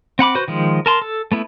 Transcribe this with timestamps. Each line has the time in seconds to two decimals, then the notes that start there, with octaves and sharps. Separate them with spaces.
0.19 C4 F#5 B5 D6
0.35 F#4 B4 C5
0.48 D#3 F3 G#3
0.86 A#4 A5 C6
1.02 A4
1.32 A3 B3 E4